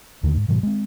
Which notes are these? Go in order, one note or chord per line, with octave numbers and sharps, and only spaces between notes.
D#2 D3 D#3 A3
G#2
G#2 B2 D#3 F#3
G#3 C4